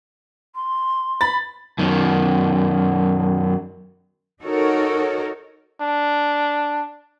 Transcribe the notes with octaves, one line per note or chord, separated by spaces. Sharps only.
C6
B5 A6
F#2 D#3
D#4 F#4 A4 A#4 C#5
D4